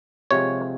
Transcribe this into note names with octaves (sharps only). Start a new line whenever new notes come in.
C3 F3 G#3 C#5